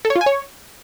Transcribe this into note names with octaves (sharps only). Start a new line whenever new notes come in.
A4
C#5
F4
G#5
C#5